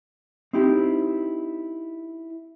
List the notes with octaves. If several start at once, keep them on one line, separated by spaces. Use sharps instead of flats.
C4 D#4 E4 G4